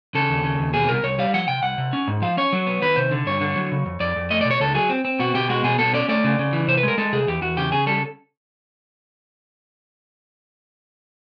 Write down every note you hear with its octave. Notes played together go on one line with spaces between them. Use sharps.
C#3 A4
D#2
C#3
D#2
B2 G#4
C2 A#4
C2 C#5
G3 F5
F3 F#5
C3 G5
C2 F#5
C3
C#4
G#2
F3 F5
C#4 C#5
F#3
B3
D#3 B4
C3 C5
D3
G2 C#5
D3
F#3
C#3
F2
F2 D5
F2
A3 D#5
B2 D5
C#5
C#2 A4
F#3 G#4
C4
C4
B2 F#4
B2 G4
G#3 F#4
B2 G#4
B2 A4
C#4 D5
A3 D5
C#3
C#3
E3
C3 C5
B4
G#3 A#4
G#3 A4
C3 G#4
E2 G4
E2 F#4
C#3 G4
C#3 G#4
G3 A4